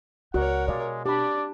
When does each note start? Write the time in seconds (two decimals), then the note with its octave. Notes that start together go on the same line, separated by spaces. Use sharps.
0.34 C#2 F#4 A#4 C#5 D5 F#5
0.68 B2 G#3 D5 F5
1.06 D4 G4 D5 B5